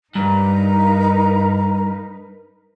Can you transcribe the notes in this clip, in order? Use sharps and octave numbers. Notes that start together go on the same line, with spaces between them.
G2 D#4 A#4 B4 A#5